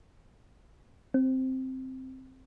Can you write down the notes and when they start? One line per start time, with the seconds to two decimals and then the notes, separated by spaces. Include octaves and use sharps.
1.14 C4